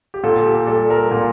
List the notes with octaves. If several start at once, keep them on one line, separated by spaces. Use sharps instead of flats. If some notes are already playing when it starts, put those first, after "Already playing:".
G4
A#2 A4
G4
G3 A4
A#4
A#2